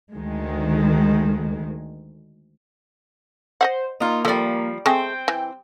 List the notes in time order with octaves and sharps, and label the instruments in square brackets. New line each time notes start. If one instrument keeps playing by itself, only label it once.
[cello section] D2 D#3 G#3
[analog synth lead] C5 [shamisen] D#5 E5 F#5
[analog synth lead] A#3 [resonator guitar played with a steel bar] D#4 F4
[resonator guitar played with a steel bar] F3 G3 [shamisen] A3 D5
[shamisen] G#3 A3 [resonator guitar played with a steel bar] C4 [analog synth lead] G5
[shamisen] E3